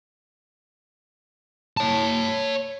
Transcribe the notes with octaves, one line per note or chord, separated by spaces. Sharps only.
C#5 A5